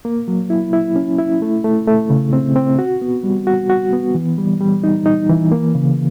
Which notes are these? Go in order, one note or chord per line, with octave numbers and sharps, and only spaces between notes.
A#3
F#3
E4
E4
C#4
E4
A3
A3
A3
C#3
C4
C4
F#4
B3
G3
F#4
F#4
B3
E3
G3
G3
D#4
D#4
E3
A#3
C#3